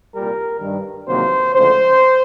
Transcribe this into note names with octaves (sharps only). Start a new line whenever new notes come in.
C2 A#2 G3 A#4
G2 D#3 G3
E2 C3 D#3 F#3 A#3 C5
D2 C#3 F3 G#3 C5